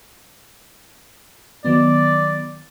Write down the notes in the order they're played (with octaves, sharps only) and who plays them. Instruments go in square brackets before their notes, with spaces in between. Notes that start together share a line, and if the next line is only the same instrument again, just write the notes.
[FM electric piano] D#3 F#3 B3 [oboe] D5